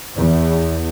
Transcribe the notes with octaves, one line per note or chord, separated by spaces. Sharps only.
E2